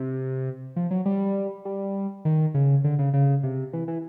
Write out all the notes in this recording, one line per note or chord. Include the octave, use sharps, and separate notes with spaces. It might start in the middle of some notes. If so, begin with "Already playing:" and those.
Already playing: C3
F3
F#3
G3
G3
D#3
C#3
D3
C#3
C#3
C3
E3
E3